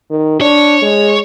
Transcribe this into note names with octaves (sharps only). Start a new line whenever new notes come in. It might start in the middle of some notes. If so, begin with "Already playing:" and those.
D#3
D4 C#5
G#3